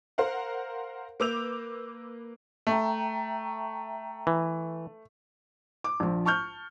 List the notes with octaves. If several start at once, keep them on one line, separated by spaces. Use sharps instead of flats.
A#4 C5 F5 F#5
A#3 B4 D6 E6 G6 F7
A3 E5 G5 A#5
E3
D6
A#1 F3
A5 C#6 F6 G6